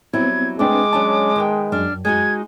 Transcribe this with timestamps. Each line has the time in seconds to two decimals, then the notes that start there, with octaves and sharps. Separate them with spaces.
0.13 F#3 G3 B3 C4 E4 G#6
0.59 G#3 A3 C4 D4 B4 G5 D6
0.93 F#3 C#4 D4 A5
1.36 D#3 B3 G5
1.72 F#2 D4 F6
2.05 G#3 D#4 F#4 G#6